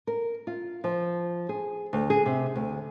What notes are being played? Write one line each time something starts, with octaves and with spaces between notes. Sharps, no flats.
A#4
F4
F3
G#4
D2
G#4
C3
D2